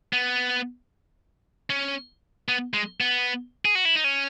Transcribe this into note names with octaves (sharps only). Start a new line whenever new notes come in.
B3
C#4
B3
G#3
B3
G#4
F#4
E4
D#4
C#4